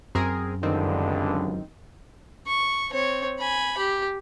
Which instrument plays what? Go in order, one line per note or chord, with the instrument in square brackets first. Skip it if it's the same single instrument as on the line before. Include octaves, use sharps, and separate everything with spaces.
[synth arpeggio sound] F#2 [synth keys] C4 G#4 A#4
[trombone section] C#2 G2 D3 [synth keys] D#3 C4
[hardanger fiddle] C#6
C4 C#5
G#5 B5
G4